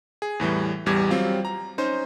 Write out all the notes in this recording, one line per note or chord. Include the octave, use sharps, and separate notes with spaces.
G#4
E2 A2 E3 G3
A1 E2 G3 D6 G#6
F#3 G3 C4 F4
A#5
C#4 D#4 C5